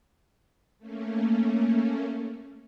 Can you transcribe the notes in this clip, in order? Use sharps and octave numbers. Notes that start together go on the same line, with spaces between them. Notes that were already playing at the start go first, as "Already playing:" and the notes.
A3 A#3 C#4